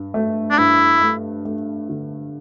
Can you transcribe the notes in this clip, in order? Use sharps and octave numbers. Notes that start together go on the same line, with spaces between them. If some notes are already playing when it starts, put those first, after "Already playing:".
Already playing: G2
A3
D4
G2 E4
A3
A3
D3